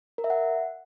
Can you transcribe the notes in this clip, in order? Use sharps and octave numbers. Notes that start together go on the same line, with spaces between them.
A#4
E5
F#5